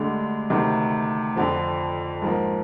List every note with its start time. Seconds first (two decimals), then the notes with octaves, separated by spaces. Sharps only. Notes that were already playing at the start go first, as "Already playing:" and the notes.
Already playing: D2 D3 G#3 D4 G4
0.50 D2 C3 D#3
1.36 F2 D3 F3
2.22 G#2 F3 A#3